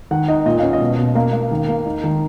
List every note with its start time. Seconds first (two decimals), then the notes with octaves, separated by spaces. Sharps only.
0.11 D#3 F#5
0.28 D#4 D#5
0.46 A#2 D#5
0.59 C#4 F5
0.73 D#5
0.81 B2
0.98 B2
1.15 A#3 F5
1.33 A#3
1.51 D#3
1.68 A#3
1.86 D#4
2.04 D#3